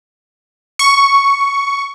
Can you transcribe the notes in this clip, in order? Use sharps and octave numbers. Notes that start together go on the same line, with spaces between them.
C#6